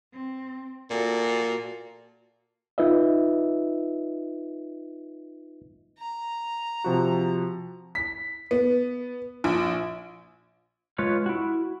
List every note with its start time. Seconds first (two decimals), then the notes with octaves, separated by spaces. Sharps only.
0.13 C4
0.90 A#2 F#4 A4
2.78 D#4 F4 B4 D#5 E5
5.98 A#5
6.84 C3 F3 F#4
7.95 B6
8.51 B3
9.44 A#1
10.98 G#3 F4 B4 C#5
11.26 E4 F#4